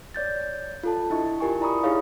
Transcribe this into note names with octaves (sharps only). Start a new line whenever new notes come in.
C#5 D5 G6 A6
F4 A4 A5
D4 E4 D#5 C#6
F4 G4 A#4 G#5 C#6
E4 D5 A#5 B5 C#6 D#6
D#4 E4 G4 G#4 C#5 F5